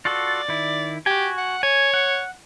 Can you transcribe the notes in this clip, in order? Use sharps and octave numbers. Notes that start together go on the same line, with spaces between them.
F4 F#4 A4 D5
D#3 E4
F#4 G4 G#5
F#5
C#5 G#5
F#5